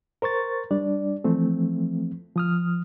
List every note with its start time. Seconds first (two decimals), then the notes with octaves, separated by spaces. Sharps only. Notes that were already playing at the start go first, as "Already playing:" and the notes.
0.22 A#4 C5 C#6 A6
0.71 G3 D4 D5
1.24 E3 F3 A3 C4
2.36 F3 D#6 F6